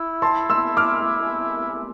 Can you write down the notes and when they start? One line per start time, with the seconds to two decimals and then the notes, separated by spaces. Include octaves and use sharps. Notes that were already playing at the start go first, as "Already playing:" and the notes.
Already playing: E4
0.22 A5 C6
0.50 C6 E6
0.77 D6 F6